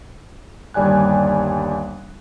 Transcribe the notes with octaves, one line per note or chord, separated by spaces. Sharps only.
G1 D#2 G3 D5 G#5 F#6